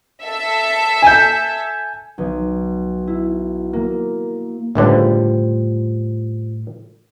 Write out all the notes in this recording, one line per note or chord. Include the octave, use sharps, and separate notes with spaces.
A4 E5
G#5 G6
B1
E4
A#3
G1 C#2 A2 D3 G3 F4 C5 F#5